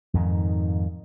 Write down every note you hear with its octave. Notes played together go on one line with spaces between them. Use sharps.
F2 G#2 D#3